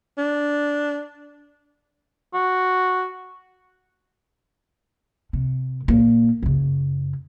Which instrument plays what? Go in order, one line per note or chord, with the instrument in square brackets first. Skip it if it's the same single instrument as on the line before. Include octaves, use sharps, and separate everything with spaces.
[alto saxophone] D4
[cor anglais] F#4
[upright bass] C3
A#2 A#3
F#2 C#3